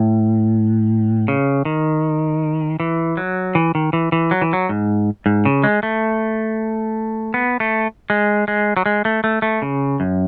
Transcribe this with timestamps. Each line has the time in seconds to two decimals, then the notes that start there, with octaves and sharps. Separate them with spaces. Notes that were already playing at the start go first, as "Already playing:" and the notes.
Already playing: A2
1.28 C#3
1.65 D#3
2.80 E3
3.17 F#3
3.55 E3
3.75 D#3
3.93 E3
4.12 E3
4.31 F#3
4.42 E3
4.53 F#3
4.69 G#2
5.26 G#2
5.45 C#3
5.64 G#3
5.83 A3
7.34 B3
7.60 A3
8.10 G#3
8.48 G#3
8.77 F#3
8.86 G#3
9.05 A3
9.24 A3
9.42 A3
9.62 C#3
10.00 F#2